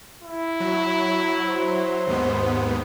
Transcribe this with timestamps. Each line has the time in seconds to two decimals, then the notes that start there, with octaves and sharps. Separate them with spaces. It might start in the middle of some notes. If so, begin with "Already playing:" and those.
0.22 E4
0.60 F#3
1.47 C5
2.07 D#2 G#2 B3